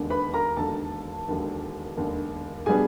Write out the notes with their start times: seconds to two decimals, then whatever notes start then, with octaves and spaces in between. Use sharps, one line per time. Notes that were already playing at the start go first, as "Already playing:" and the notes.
Already playing: E1 D#2 D3
0.10 B4 B5
0.34 A#4 A#5
0.56 E1 D#2 D3 A4 A5
1.27 E1 D#2 D3
1.97 E1 D#2 D3
2.66 B2 G3 B3 D4 G#4 G#5